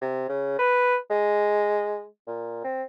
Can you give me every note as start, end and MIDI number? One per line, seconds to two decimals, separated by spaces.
0.01 0.28 48
0.29 0.56 49
0.59 0.96 71
1.10 2.05 56
2.27 2.64 46
2.64 2.83 60